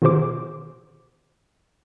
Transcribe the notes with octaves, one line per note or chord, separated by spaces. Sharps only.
B2 D#3 F#4 G#4 C5 D6